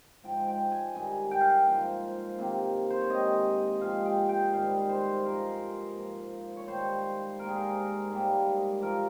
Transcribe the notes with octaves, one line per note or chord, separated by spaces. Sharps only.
G#2 F3 G#3 G5
G5
G#5
G2 D#3 G#3 G#5
G5
F5
G5
G#2 F3 A#3 F5
C3 D#3 A#3
C5
C#5
C3 D#3 G#3 D#5
C3 F3 G#3 F5
G5
G5
G#2 D#3 G3 F5
C5
G2 F3 G#3 A#4
G#2 F3 A#3
C#5
G#2 D#3 G3 A#3 C5
G#2 G3 A#3 A#4
G#4
A#4
G#2 G3 A#3
G2 F3 A#3 A#4